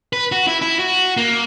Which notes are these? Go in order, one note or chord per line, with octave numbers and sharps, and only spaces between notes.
B4
F#4
E4
E4
F#4
A#3